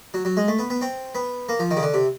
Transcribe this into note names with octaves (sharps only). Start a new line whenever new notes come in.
F#3
F#3
G#3
A3
B3
B3
C4
B3
A#3
F3
D#3
C#3
D3
C3